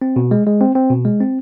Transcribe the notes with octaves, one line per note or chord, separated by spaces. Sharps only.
C4
B2
G#3
G#3
C4
C4
B2
G#3
C4